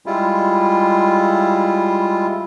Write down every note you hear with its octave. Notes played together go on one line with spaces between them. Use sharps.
G3 G#3 E4 F4